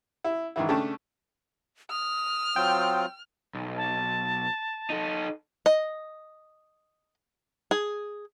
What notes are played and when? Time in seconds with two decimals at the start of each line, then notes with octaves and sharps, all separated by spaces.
0.24 E4
0.56 G#2 D#3 E3 E4
0.68 C#3 A3 C#4 D4 G5 A5
1.91 D#6 F6
2.56 F#3 C4 F4 G5
3.54 B1
3.77 A5
4.90 D#4 A4
5.66 D#5
7.71 G#4